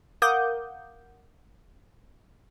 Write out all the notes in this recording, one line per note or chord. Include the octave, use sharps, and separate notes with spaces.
A#4 F5 F#5 D6 D#6 G6